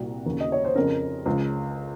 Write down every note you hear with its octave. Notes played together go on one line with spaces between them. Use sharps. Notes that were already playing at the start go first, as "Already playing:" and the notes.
Already playing: C2 A#2 F#4
D#2 C#3
D#5
C#5
C5
F2 C#3 A#4
C#2 C#3